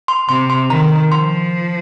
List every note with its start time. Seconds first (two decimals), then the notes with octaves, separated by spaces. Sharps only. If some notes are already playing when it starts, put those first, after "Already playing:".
0.08 C6
0.29 C3 C6
0.50 C6
0.70 D#3 A#5
1.12 F3 C6